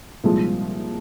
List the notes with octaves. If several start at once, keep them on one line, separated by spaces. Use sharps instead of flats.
C2 A#2 F3 G#3